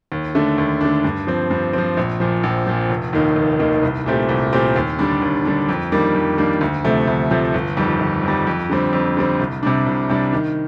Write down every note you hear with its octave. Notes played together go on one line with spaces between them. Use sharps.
D#2
D3 A3 D4
D#2
D3 A3 D4
G2
F3 C4
G2
F3 C4
A#1
A#2 F3
A#1
A#2 F3
F1
D#2 D#3 A#3 D#4
F1
D#2 D#3 A#3 D#4
C2
A#2 A3 C4 G4
C2
A#2 A3 C4 G4
D#2
D3 G3 D4
D#2
D3 G3 D4
F2
D#3 G3 A#3 D4
F2
D#3 G3 A#3 D4
D2
C3 F3 A3
D2
C3 F3 A3
G1
F2 D#3 G3
G1
F2 D#3 G3
F2
D3 G3 C4
F2
D3 G3 C4
C2
C3 G3 D4
C2
C3 G3 D4
D#3